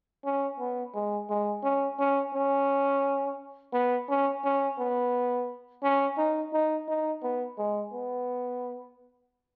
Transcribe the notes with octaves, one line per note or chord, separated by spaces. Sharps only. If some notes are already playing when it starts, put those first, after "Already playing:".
C#4
B3
G#3
G#3
C#4
C#4
C#4
B3
C#4
C#4
B3
C#4
D#4
D#4
D#4
B3
G#3
B3